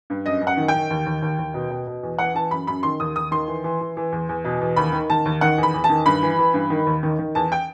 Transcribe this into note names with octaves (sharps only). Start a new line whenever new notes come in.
G2
F#2 D#5
F#2
F#5
D#3
G5
D#3
D#2
D#2
D#2
D#2
B2
B2
B2
E2
E3 F#5
E3 A5
F#2 B5
F#2 B5
D#3 C6
D#2 D#6
D#2 D#6
D#3 C6
E3
E3
E3
E3
E2
E2
B2
E2
D#2 B5
D#3
D#3 A5
D#2
D#3 F#5
E2
B5
E2
A5
D#3
G2 B5
E3
E3
G2
D#3
D#2
D#3
D#3
E2 A5
G5